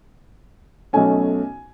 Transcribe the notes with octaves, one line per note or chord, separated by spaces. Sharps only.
B1 B2 A3 C#4 G#5